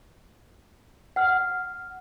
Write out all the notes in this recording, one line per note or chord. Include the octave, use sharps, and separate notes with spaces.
F#5 F6